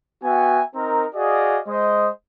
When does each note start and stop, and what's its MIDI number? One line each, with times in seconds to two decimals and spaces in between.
0.24 0.62 59
0.24 0.62 66
0.24 0.62 76
0.24 0.62 79
0.24 0.62 80
0.75 1.05 60
0.75 1.05 63
0.75 1.05 70
1.15 1.58 66
1.15 1.58 68
1.15 1.58 74
1.15 1.58 75
1.15 1.58 77
1.68 2.08 56
1.68 2.08 72
1.68 2.08 75